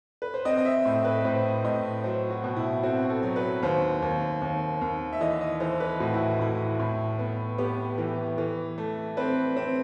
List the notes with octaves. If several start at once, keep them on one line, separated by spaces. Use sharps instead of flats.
B4
C5
C4 D#5
D#5
E5
A2
B4
A2 C5
A2 D#5
F#3 C5
F#4
B2
E4
C4 F#4
A4
F#3
B4
D#2 C5
D#2
D#2
D#2
E5
E3 D#5
D#5
E3 C5
B4
A2 F#4
E4
A2 E4
A2
B3
B3 G4
E3
E3
A3
C4 B4
C4